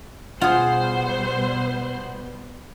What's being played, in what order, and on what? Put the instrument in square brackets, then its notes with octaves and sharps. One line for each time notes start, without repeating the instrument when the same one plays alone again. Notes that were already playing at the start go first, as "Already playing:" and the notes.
[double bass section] B2 G3 B3 [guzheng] F4 G#4 [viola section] C5 [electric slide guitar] F#5